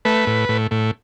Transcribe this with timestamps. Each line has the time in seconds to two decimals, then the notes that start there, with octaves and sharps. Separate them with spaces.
0.05 A3 B4
0.27 A2
0.49 A2
0.71 A2